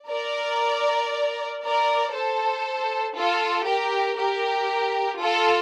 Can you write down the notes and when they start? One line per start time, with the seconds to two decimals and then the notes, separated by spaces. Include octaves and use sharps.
0.10 A#4 D5
1.64 A#4 D5
2.15 A4 C5
3.17 F4 A4
3.68 G4 A#4
4.19 G4 A#4
5.20 F4 A4